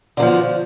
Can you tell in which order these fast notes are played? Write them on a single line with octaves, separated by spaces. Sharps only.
D3 F#3 F3 B3 F#4